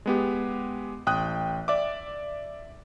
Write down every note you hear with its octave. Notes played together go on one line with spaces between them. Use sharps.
G#3 B3 G4
A1 G5 D#6 F#6
D5 E5 D6